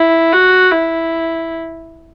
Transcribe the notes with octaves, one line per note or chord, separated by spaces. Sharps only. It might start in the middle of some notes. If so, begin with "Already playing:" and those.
Already playing: E4
F#4
E4